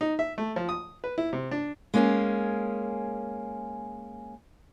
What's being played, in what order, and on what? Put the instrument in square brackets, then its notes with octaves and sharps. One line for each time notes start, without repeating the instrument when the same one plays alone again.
[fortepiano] D#4
E5
A3
F3
D#6
B4
E4
C3
D4
[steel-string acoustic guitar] G#3 A#3 C#4 F#4 G#4